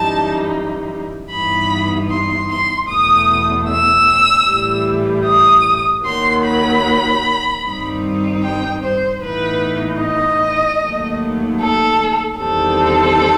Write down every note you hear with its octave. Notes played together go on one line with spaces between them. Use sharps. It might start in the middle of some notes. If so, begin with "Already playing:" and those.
Already playing: F#2 E3 G3 D#4 A5
G2 E3 B3 D#4 B5
C6
C6
E2 B2 A3 D#6
E6
A2 E3 G3
D#6
D#2 D#3 F#3 C6
B5
G2 D#3 G3 C4 D#4
G5
C5
A2 E3 B3 D#4 B4
D#5
D#2 D#3 F#3 A3
A4
E2 D#3 G3 C4 A4